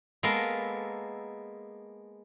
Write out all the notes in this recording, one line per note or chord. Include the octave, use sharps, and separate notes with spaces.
G#3 A#3 B3 A4 A#4